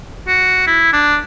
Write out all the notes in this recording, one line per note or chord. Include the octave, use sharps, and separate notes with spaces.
F#4
E4
D4